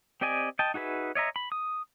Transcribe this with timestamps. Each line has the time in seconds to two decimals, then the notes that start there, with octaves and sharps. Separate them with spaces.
0.21 C4 G4 D5 D#5 G#5
0.59 D#5 G5 A5
0.74 D#4 F#4 G#4 B4 E5
1.15 C#5 D#5 E5 A#5
1.36 B5
1.52 D#6